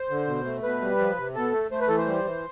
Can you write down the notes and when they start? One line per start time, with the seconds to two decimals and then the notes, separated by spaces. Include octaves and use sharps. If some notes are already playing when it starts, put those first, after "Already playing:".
Already playing: C5
0.10 D3
0.27 B2
0.45 A3
0.63 B2 B4
0.82 G3
0.99 F3
1.17 C3
1.35 B2 A4
1.52 A3
1.71 A3 C5
1.80 B4
1.88 E3 A4
1.98 C5
2.06 G3
2.24 E3